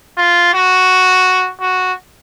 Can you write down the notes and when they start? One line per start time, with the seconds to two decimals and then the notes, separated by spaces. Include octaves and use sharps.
0.17 F4
0.54 F#4
1.61 F#4